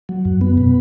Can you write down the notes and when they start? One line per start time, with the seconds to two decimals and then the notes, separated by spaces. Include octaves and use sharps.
0.09 F#3
0.25 F#2
0.41 B3
0.58 B2